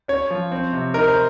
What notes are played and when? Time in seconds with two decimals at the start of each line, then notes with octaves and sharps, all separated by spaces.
0.08 C#4 C#5
0.31 F3
0.52 C4
0.73 C3
0.94 D#4 A#4
1.08 C5